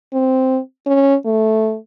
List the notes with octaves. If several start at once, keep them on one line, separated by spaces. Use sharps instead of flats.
C4
C#4
A3